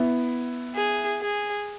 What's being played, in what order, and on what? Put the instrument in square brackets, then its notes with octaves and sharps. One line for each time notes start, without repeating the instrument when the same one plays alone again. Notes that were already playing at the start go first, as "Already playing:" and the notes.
Already playing: [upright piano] B3 E4
[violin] G#4
G#4